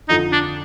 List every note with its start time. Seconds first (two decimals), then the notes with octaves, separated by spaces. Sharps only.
0.09 F2 D3 F3 D#4
0.32 D4